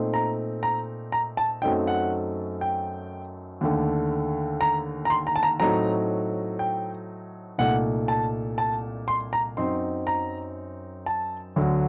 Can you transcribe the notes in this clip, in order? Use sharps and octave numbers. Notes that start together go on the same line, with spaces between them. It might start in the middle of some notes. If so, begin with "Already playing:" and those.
Already playing: A#2 A3 C4 D#4
A#5
A#5
A#5
A5
F#2 F#3 A3 C4 D#4 G5
F#5
G5
D#2 D3 A3
A#5
A#5
C6
A#5
A5
A#5
A2 F#3 A3 C4 D#4 A#5
G5
C2 A#2 A3 D#4 F#5
A5
A5
C6
A#5
F#2 F#3 C4 D#4 C6
A#5
A5
D2 D3 F#3 A3